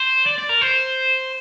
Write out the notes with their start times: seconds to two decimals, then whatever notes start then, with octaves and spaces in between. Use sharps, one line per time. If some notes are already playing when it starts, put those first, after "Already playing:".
Already playing: C5
0.26 D5
0.38 D5
0.49 A#4
0.61 C5